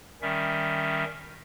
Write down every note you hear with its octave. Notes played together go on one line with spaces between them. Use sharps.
D#3 G3 C#4 E5